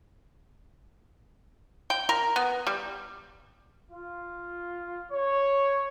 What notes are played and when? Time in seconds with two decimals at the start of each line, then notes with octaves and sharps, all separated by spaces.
1.90 G5
2.09 A#4
2.36 B3
2.67 G3
3.91 F4
5.11 C#5